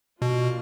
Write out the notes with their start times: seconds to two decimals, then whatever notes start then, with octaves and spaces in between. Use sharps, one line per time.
0.22 B2 A#3 D4 F4